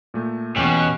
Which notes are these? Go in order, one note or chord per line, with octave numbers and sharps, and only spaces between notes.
A#2 A3
E2 B2 C#4 G4 F#6